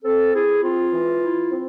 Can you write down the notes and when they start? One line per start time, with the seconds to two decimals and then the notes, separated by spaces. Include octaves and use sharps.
0.03 C4 A4
0.34 E4 G#4
0.62 C4 F4
0.92 E3
1.21 E4
1.50 C4